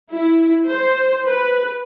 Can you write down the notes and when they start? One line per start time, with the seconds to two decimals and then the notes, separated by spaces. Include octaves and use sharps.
0.11 E4
0.67 C5
1.27 B4